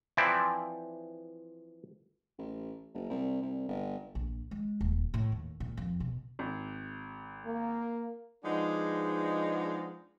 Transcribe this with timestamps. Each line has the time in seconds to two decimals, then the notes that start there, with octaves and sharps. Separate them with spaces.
0.17 E3 F3 C4 E4 D5
2.38 A1
2.94 F#1
3.10 C2
3.42 C2
3.68 G1
4.15 A#1
4.51 G#3
4.81 D#1
5.14 A2
5.32 D#2
5.60 A#2
5.77 F2
6.00 B2
6.39 G#1
7.45 A#3
8.44 F3 G#3 B3 D4 D#4 G#4